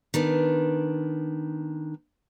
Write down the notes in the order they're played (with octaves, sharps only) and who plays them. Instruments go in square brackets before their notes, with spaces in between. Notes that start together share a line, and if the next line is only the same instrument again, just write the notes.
[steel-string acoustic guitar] D#3 B3 D4